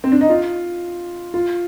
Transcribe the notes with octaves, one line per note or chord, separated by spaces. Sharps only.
C4
D4
D#4
F4
F4